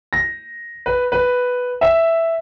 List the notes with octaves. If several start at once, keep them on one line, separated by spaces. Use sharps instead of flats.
A#6
B4
B4
E5